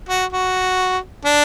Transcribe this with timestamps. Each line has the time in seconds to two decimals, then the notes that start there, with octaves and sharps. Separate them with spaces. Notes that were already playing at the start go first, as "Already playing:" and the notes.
0.09 F#4
0.33 F#4
1.25 D4